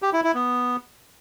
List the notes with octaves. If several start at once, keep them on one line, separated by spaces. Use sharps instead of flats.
G4
E4
E4
B3